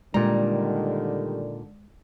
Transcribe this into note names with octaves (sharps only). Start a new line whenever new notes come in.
A#2 D3 D#3 G3 G#3 A#5